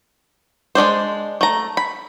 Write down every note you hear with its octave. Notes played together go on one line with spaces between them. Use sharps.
G#3 A3 D4 C5
A3 A#5
B5